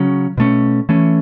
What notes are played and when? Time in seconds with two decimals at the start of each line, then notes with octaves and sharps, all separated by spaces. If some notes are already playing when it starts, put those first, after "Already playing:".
Already playing: C#3 F#3 C#4
0.38 B2 A3 C#4
0.89 E3 A3 C#4